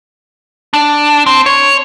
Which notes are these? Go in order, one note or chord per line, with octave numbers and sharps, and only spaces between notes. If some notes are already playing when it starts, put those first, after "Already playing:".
D4
C4
C#5